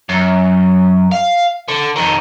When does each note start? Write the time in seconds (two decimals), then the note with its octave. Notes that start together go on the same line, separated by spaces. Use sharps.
0.09 F#2
1.12 F5
1.68 D3
1.96 F2 D#3